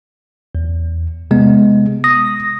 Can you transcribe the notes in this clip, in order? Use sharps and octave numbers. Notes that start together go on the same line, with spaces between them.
E2
C3 G#3 B3
D#6 A#6